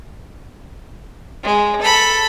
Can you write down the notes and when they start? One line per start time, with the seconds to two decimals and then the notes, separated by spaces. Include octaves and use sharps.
1.44 G#3
1.81 A4 B5